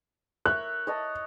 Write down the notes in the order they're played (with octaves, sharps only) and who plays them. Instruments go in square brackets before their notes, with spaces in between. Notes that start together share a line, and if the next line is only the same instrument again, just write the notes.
[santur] A#4 C#5 E5 [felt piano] F#6
[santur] C#5 D#5 A5